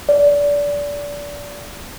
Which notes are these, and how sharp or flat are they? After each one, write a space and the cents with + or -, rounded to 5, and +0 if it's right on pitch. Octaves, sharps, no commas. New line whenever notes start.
D5 -25